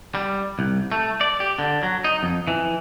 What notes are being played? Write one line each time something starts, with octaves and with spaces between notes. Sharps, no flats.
G3
C2
A3
D5
G4
D3
F#3
D#4
F2
E3